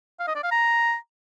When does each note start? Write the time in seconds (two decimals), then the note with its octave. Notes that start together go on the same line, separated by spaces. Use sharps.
0.19 F5
0.27 D#5
0.35 D5
0.43 F5
0.51 A#5